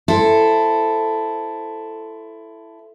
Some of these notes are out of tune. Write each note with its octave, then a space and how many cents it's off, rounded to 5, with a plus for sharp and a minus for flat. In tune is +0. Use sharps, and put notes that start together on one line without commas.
E4 +15 A4 +0 C5 +0